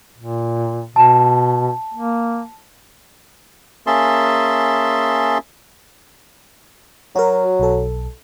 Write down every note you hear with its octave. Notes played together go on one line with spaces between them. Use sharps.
A#2
B2 A5
A#3
A#3 C#4 G#4 E5 A5 C6
F#3 F#4 A#4
B1 A4